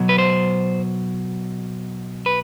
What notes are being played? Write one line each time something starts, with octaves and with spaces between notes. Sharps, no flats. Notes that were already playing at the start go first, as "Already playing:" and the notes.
Already playing: B2 F#3
B4
C5
B4